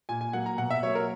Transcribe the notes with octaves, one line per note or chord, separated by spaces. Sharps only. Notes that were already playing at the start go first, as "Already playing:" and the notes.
A#2 G#5
G#5
F#3 A#3 F#5
A#5
B2 F#5
E5
F#3 A#3 C#5
A#4